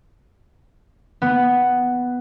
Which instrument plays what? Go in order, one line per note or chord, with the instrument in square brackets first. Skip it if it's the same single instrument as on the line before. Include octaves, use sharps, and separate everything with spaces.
[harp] B3